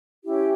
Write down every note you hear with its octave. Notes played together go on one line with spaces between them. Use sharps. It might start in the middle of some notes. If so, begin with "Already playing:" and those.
C#4 E4 G4